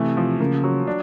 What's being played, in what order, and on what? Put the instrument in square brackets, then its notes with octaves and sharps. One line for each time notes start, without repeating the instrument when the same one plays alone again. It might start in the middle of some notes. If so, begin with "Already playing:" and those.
Already playing: [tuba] C3 [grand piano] E3 A3
[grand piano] F3
[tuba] C#3 [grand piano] A#3
[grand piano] F#3
D4